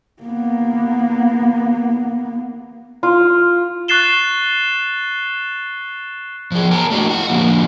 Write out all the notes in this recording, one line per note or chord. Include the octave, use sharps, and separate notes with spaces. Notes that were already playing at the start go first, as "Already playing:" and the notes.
A#3 B3
F4
C#6 F#6 A6 C7 E7 G7
F3 G#4
A#4 G5 A5 A#5
A3 D4 F#4 D5 D#5
F4 F#5
D3 F3 A#3